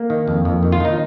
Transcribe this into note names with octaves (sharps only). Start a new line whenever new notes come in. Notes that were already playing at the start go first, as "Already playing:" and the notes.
Already playing: A#3
D#3
F2
F2
D#3
F4
D#3 D#4